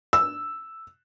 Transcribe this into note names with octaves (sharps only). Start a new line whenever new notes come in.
E6